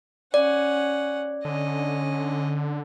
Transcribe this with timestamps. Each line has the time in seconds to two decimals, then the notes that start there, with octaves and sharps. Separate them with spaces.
0.34 C#4 D5 F#5
1.45 D3 C#4 D#5